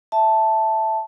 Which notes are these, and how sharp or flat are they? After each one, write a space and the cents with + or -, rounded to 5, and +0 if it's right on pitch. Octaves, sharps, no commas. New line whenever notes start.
E5 +0 A5 +0